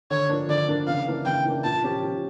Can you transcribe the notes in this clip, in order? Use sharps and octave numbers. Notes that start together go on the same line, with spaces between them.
D3 C#5
F3 A#3 D4
D3 D5
F3 A#3 D4
C#3 F5
E3 A#3 D4
C#3 G5
E3 A#3 D4
A#2 A5
F3 C#4 G4
A#2